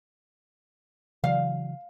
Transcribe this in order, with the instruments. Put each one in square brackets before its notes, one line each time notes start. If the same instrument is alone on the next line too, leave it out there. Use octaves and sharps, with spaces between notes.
[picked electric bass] C#3 E3 F#3 [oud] F5